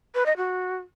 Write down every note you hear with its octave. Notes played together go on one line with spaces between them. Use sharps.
B4
D#5
F#4